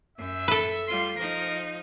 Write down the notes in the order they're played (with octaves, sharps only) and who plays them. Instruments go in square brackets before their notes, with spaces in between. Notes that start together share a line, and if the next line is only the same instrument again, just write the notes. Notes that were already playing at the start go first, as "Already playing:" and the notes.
[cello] F#2 F#3 [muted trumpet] E5
[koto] A4 B4
[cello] G3 F4 [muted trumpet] C6
[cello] F3 D#4 [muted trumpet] A#4